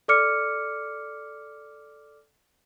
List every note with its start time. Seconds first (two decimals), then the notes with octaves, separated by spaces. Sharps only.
0.08 A4 D5 D6 F6 C#7